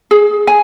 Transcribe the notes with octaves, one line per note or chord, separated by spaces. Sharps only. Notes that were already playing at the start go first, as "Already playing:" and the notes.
G#4
G#5